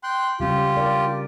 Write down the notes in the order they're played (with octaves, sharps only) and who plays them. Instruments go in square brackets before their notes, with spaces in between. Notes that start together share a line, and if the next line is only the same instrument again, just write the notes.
[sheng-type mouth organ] G5 C6 F#6
[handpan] C#3 G3 C#4 [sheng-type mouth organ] F4 G4
[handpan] A#4 D5